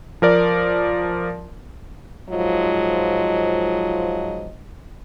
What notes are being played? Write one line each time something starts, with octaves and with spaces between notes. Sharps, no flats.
F3 A#4 D5
G#2 F3 F#3 F4 D#5